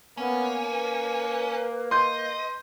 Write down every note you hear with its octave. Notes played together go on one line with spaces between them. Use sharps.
A#3 B3 C#4
B4
D#5 C6 G6